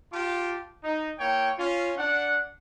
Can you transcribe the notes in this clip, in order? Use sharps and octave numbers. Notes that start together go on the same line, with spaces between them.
F4 G4 A5 D6
D#4
A#3 E4 C#5 G5
C#4 F4
D4 F#5